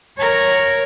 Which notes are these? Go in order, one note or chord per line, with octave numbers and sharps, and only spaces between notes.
A#4 C#5